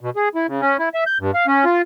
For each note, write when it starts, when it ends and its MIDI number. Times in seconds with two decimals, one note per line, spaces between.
0.01 0.10 47
0.16 0.29 68
0.35 0.47 64
0.48 0.61 49
0.61 0.77 61
0.79 0.89 64
0.94 1.04 76
1.07 1.18 91
1.20 1.31 43
1.34 1.46 77
1.47 1.65 61
1.65 1.82 65